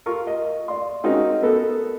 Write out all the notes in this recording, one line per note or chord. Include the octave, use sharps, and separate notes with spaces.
F4 A#4 C#6
D#5
D5 C6
G#3 C4 C#4 D#4 F#4 A#4
B3 A4 A#4